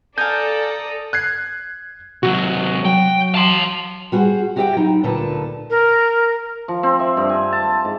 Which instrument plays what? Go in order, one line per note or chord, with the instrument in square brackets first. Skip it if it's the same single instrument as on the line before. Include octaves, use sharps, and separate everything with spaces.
[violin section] A4 D5 [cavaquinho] F5 G#5 [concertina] A#5 D#6 [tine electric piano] G6
[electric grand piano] F#6 G#6 C7
[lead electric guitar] C3 F#3 [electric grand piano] F#4
[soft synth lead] F#3 [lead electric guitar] G5
[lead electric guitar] A5 C6
[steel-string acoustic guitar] G3 F#4 G#4 B4 C5
F#4 G4 A#4 D#5 E5 G5
F#3 D#4 E4
D2 A#2 D3 A4 B4 A5
[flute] A#4
[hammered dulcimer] F3
C4
E5
G2
G#5
A5
A5
G#2